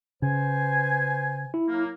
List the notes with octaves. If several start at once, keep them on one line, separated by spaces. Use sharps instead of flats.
C#3 B4 C5 G#5
E4
F#3 A#3